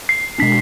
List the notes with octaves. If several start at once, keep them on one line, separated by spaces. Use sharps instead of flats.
C7
B2 G#3 B3 D4 B6